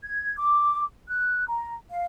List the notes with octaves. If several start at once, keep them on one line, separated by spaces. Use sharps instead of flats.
G#6
D6
F#6
A#5
F5